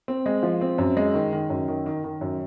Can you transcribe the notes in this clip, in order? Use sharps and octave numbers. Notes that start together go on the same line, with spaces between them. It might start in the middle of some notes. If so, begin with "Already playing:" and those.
C4
G#3
F3
C4
F#2
G#3
D#3
D#3
F#2
D#3
D#3
D#3
F#2